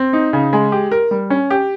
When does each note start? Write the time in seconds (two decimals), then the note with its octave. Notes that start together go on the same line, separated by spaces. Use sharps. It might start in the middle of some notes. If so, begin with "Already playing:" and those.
Already playing: C4
0.13 D#4
0.33 C#3
0.53 G#3
0.72 G4
0.91 A#4
1.11 G3
1.30 C#4
1.50 G4